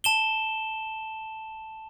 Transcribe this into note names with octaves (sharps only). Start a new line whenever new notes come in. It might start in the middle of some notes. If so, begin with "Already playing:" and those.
A5 E7 G7